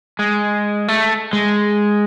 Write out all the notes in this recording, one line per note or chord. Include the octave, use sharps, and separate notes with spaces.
G#3
A3
G#3